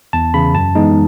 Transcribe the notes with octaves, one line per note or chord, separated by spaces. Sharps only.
E2 A5
C#3 E3 B5
F#2 A5
E3 G#3 B3 D#4